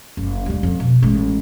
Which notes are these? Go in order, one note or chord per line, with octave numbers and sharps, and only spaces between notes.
F#1
D#2 G3
F2
B2
A1 G#3